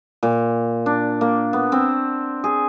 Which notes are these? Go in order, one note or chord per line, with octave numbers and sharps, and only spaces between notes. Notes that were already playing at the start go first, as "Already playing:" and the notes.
A#2
D4
A#3
B3
C4
G#4